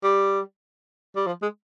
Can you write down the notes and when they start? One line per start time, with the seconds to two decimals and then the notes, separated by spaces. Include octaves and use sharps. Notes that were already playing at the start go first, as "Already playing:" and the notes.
0.03 G3
1.16 G3
1.27 F3
1.42 G#3